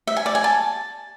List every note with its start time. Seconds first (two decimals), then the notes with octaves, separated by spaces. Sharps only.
0.07 E5
0.17 G#5
0.26 D5
0.35 G#5
0.44 A5